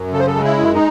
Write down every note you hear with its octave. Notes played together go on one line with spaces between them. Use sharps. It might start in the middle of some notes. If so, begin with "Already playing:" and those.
Already playing: F#2
C#3 A4
C5
A4
G#3
E4
F#2
D#4